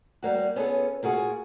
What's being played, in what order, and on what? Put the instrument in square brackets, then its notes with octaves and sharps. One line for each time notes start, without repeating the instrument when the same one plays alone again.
[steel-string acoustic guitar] G3 A#3 F#4
B3 C#4 F4 G#4 A4
A#3 F4 F#4 G#4